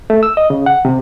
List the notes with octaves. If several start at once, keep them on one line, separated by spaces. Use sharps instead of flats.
A3
E6
D#5
C#3
F#5
C3